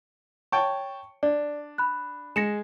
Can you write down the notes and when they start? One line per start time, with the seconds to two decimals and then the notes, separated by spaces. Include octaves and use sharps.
0.52 C#5 G5 A5 C#6
1.23 D4 D5
1.78 B5 F#6
2.36 G#3 A#6 C#7 E7